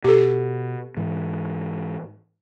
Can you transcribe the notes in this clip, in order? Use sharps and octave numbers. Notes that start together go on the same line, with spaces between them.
B2 G4 A4
G#2 E3